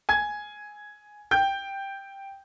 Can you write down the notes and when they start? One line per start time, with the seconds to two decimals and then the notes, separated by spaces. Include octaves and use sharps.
0.09 G#5 G#6
1.31 G5 G6